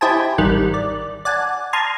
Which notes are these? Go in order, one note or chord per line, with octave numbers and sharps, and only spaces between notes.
E4 G4 C5 D#5 G#5 A5
G#1 D#3 G3 F#6
D5
D5 F#5 G#5 A5
A5 A#5 C6 D#6 F6 G#6